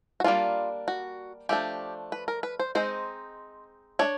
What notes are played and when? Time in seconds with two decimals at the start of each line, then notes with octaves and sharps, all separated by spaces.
0.20 F#4
0.24 G3 A#3 D4 F4
0.88 F#4
1.49 F3 A3 D4 G4
2.12 B4
2.28 A#4
2.43 B4
2.59 C5
2.75 G#3 C4 D#4 C5
3.99 A3 D4 C#5